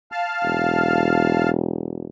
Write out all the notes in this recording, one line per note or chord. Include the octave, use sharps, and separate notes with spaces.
F5 A5 F6
E1